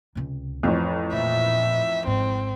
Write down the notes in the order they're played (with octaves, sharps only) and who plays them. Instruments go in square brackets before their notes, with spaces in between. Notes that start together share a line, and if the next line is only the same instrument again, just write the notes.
[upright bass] C#2 C3
[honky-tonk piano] A1 F2 [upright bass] C4 C#4
[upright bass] A#2 [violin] E5
[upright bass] G#1 G#2 [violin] C4